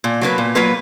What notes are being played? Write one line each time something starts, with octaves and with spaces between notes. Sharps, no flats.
A#2
F#3 A#3 F4 B4
A#2
F#3 A#3 F4 B4